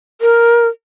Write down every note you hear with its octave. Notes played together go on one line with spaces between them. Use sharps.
A#4